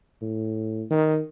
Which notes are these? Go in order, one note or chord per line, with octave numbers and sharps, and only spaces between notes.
A2
D#3